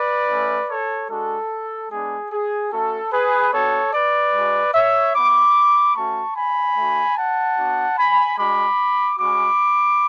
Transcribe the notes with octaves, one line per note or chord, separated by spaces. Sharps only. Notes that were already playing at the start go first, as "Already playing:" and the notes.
Already playing: B4 D5
A3 C#4 E4
A4 C#5
G#3 D4 F#4 A4
G#3 B3 D4 G#4
G#4
A3 C#4 F#4 A4
G#4 B4
B3 D4 F#4 A4 C#5
B4 D5
G#3 D4 F#4
C#5 E5
B3 E4 B5 D6
A3 C#4 F#4 A5 C#6
G#5 B5
A3 D4 F#4
F#5 A5
B3 D4 F#4
G#5 B5
G#3 D4 F#4 B5 D6
G#3 C#4 F#4 B5 D6